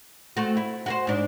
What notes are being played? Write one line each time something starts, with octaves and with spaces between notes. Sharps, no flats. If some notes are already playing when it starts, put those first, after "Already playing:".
A3 C4 F#4
E4
F#4 G#4 C5
G#2 D4